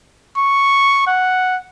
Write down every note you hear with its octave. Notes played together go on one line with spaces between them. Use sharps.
C#6
F#5